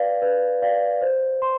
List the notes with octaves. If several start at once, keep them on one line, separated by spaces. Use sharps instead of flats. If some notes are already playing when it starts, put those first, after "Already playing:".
Already playing: B4 D5 F5
B4
D5 F5
C5
C6